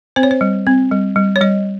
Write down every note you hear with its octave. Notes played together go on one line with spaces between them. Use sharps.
C4 C5
C#5
C5
G3
C4
G3
G3
C#5
G3 D#5